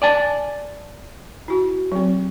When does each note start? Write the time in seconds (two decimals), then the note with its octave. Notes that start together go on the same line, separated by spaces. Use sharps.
0.02 D5 G#5 A5
1.48 E4 F#4
1.92 F#3 C4